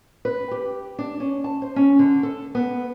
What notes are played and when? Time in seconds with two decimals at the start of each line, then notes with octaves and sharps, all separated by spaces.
0.25 B4
0.51 G4
0.99 D4
1.20 C#4
1.44 A5
1.62 C5
1.76 C#4
1.99 D3
2.23 A4
2.55 B3